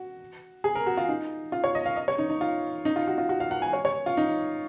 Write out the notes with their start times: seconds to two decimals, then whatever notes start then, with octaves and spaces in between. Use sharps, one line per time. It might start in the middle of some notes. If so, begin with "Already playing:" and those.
Already playing: F#4
0.64 G#4
0.75 A#4
0.86 F#4
0.97 F4
1.09 D#4
1.52 F4
1.64 C#5
1.75 D#5
1.86 F5
1.96 D#5
2.08 C#5
2.18 D#4
2.30 D#4
2.41 F4
2.85 D#4
2.96 F4
3.08 F#4
3.18 F4
3.29 F#4
3.40 F5
3.51 F#5
3.62 G#5
3.73 C#5
3.85 C#5
4.06 F4
4.17 D#4